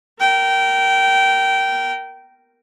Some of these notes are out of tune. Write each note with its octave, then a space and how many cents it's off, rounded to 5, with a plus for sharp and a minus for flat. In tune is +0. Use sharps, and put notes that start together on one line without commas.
A#4 +0 G5 -20